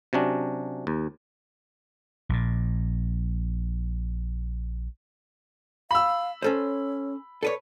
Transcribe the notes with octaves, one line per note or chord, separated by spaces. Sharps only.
C3 F#3 C#4 D4
D#2
A#1 A#2
F5 B5 E6
C#4 A4 C5 C#5
A4 B4 C#5 D5